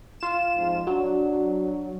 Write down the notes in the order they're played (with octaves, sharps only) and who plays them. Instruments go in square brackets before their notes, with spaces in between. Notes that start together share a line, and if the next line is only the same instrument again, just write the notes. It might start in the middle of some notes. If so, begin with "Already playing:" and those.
[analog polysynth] F4 E7
[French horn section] F2 G#2 F3
[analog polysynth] F#3 [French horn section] D4